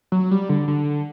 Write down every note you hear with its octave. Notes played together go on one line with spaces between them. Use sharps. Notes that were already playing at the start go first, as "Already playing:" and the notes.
F#3
G3
D3
D3